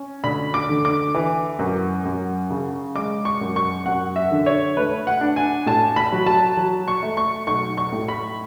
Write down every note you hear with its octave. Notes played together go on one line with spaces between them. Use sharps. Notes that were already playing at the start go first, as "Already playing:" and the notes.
Already playing: C#4
D2 B5
D6
D3
D6
E3
F#2
F#2
C#3
G#3 D6
C#6
F#2
C#6
F#2 F#5
E5
D3
C#5
A3 B4
F#5
D4
G#5
A2 A5
B5
F#3
A5
F#3
C#6
A3
C#6
B1 C#6
C#6
A2
B5